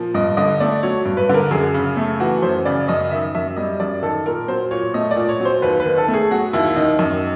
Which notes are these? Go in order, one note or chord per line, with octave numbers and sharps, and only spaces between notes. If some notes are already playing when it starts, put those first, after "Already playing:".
Already playing: A#2 F3
G2 D#5
D3 D#5
A3 D5
F#3 C#5
G2
B4
D3
A#4
F#2 G#4
C#3
A3
E3 F#4
F#2 C5
C#3 D5
F#2 D#5
D#3 E5
F#2 E5
G3 D#5
F#2 D5
D#3 A4
A#2 A#4
F#3 C5
A#2 C#5
A3 D#5
D5
A#2
C#5
F#3
C5
D#2 B4
B4
D#3
A4
A3
G#4
F#3 F#4
D#2 E4
D#3 D#4
F#2